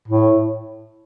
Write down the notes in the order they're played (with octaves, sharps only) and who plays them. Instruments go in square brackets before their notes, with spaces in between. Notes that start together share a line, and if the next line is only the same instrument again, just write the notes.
[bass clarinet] A2